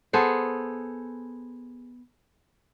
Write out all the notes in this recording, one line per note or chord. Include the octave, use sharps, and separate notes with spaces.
B3 G#4 A4 C5